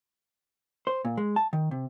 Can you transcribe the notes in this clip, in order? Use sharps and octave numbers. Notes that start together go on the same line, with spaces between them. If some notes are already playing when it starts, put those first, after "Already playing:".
C5
A#2
G#3
A5
D#3
C3